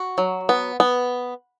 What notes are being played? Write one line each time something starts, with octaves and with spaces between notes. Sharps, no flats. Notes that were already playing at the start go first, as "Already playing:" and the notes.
Already playing: F#4
F#3
B3
B3